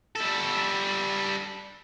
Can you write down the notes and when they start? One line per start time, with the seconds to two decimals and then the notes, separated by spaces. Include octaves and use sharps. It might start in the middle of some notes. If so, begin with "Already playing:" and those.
0.15 G3 A4